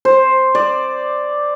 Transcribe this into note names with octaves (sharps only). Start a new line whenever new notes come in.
C5
D5